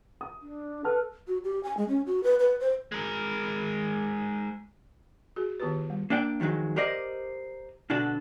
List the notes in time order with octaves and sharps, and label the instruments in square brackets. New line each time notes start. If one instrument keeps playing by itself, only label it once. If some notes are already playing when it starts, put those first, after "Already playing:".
[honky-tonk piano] D#6
[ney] D4
[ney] A4 [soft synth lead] B4 [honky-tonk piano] A5 F6
[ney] F#4
G4
G#5
G#3
C#4
F#4
B4
B4
C5
[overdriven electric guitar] G#3 A#4
[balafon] F#4 G#4
D#3 B3 F4 G4 B4
G3
[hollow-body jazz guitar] A#3 D4 D5 G5
F2 D#3 F3 F#3 G#3
G4 A#4 C5 D5 D#5
B2 D3 D4 F#4 A4